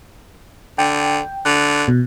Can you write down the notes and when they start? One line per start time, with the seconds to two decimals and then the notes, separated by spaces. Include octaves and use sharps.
0.78 D3 G5
1.45 D3 F#6
1.88 B2